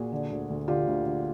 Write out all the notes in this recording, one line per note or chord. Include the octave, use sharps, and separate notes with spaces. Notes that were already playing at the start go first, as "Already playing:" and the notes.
Already playing: A#2 F#4 G#4
D3
D2
D2
D3 F4 G4
D2
D3